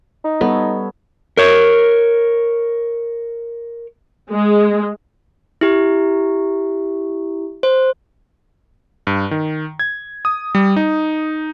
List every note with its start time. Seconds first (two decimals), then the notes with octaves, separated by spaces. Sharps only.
0.24 D#4
0.41 G3 B3 A4 C#5
1.37 A#4 C#5
4.32 G#3
5.61 E4 G4
7.63 C5
9.07 G2
9.31 D#3
9.79 G#6
10.25 D#6
10.55 G3
10.76 D#4